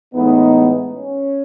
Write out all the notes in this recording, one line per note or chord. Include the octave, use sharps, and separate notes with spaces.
A2 E3 G#3 B3 D#4
C#4